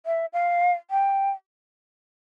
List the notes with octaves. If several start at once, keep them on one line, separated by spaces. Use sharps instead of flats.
E5
F5
G5